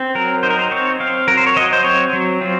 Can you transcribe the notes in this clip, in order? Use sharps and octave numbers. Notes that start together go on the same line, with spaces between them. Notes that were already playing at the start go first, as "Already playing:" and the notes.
Already playing: C4
F#3 A#4
D#4 C5
A#4
C5
C4 C#5
C4 F5
F#3 A#4
C5
C#5
F#3 D#5
C5
C4 C#5
F#3
C4 F4